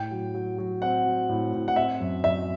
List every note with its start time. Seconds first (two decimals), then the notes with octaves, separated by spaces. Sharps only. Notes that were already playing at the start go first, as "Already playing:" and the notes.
Already playing: A2 G5
0.11 F#3
0.34 F#3
0.58 F#3
0.82 C4 F#5
1.05 F#3
1.29 A2
1.53 A2
1.68 F#5
1.76 C4 E5
2.00 F#2
2.24 F#2 E5